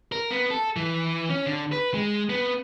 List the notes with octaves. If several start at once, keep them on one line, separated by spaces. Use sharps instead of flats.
A#4
B3
A4
E3
C#4
D3
B4
G#3
B3